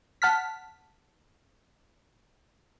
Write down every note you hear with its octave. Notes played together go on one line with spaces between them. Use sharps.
F#5 A5 F6 B6